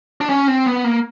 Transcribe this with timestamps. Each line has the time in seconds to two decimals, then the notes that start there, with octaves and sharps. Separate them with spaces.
0.21 D4
0.29 C#4
0.48 C4
0.66 B3
0.84 A#3